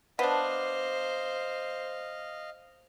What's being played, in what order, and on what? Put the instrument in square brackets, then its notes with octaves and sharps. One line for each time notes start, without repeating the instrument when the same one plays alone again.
[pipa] B3 D4 [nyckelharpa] C5 [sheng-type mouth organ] D#5 F5